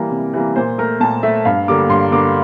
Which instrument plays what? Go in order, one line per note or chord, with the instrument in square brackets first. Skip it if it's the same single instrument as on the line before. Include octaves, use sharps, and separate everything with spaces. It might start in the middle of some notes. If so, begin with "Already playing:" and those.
Already playing: [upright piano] E3 G3 A#3
C3
E3 G3 A#3
A#2 C5
A3 A#4
A#2 A5
A3 E5
G2 F5
D3 G3 A#3 D6
G2 C6
D3 G3 A#3 D6